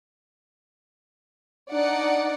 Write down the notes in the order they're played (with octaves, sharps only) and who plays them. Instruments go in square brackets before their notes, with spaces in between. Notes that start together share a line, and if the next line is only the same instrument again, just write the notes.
[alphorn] D4 [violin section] D#4 D5 F#5